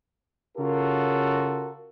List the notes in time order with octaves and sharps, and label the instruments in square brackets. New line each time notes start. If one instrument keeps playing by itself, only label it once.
[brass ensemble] C#3 F4 F#4 A4 A#4